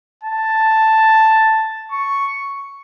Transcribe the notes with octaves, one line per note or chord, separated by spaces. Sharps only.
A5
C#6